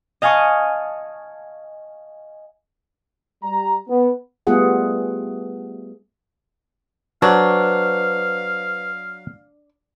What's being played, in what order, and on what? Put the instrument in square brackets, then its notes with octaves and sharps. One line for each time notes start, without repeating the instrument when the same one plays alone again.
[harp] D#5 F5 G#5 A5 C#6 D#6
[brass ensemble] G3 A#5
B3
[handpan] G3 A3 B3 F4 G#4 F#5
[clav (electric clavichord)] F#3 [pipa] D4 [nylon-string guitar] B4 C5 [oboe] F5